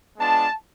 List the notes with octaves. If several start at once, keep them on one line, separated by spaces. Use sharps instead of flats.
G#3 B3 D4 F4 A5